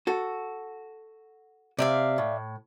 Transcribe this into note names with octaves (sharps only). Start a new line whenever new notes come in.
F#4 A4
C3 D5 E5 F5
A2